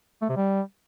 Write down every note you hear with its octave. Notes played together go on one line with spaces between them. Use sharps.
A3
C3
G3